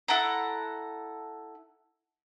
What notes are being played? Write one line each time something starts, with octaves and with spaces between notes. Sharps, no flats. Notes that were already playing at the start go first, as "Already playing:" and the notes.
E4 A4 F#5 A#5